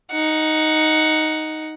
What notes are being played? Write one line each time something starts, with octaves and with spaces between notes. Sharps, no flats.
D#4 F#5